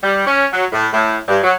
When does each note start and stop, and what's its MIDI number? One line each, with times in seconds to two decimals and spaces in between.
0.03 0.22 55
0.26 0.47 61
0.52 0.65 54
0.72 0.87 45
0.93 1.17 45
1.28 1.39 43
1.43 1.54 54